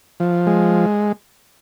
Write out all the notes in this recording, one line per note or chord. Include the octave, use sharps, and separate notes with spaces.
F3
G#3